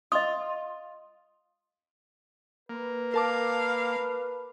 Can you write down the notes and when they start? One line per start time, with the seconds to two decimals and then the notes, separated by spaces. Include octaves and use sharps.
0.12 F4 D#5 D#6
2.69 A#3 B4
3.14 A#4 F5 A5 D6